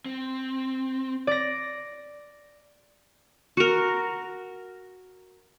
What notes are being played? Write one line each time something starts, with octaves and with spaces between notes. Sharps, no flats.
C4
D5 A#6
F#4 A#4